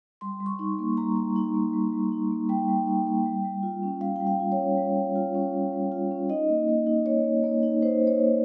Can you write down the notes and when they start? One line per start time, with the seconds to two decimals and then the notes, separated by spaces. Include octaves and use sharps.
0.21 G3 C6
0.40 G3
0.46 C#6
0.59 D#4
0.79 A#3
0.97 G3 A#5
1.16 G3
1.36 D#4
1.55 A#3
1.73 G3
1.92 G3
2.12 D#4
2.31 A#3
2.49 G3 G5
2.69 G3
2.87 D#4
3.07 A#3
3.26 G3
3.44 G3
3.63 F4
3.83 C#4
4.01 G3 F5
4.16 G3 G5
4.27 F5
4.40 F4
4.52 C#5
4.58 C#4
4.77 G3
4.97 G3
5.16 F4
5.35 C#4
5.54 G3
5.73 G3
5.92 F4
6.11 C#4
6.30 D#4 D#5
6.49 A#3
6.68 A#3
6.86 D#4
7.06 D#4 C#5
7.24 A#3
7.44 A#3
7.63 D#4
7.82 D#4 C5
8.00 A#3
8.07 C#5
8.20 A#3